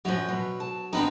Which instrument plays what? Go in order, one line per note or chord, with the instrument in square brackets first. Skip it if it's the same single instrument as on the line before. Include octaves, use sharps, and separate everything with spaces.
[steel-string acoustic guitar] F#2 A#2 F3 [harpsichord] F#3
[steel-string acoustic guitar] B2
A5
[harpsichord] D#3 B3 C4 [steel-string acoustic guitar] D4 A#5